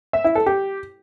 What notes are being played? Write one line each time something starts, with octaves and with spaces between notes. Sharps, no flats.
E5
E4
A4
G4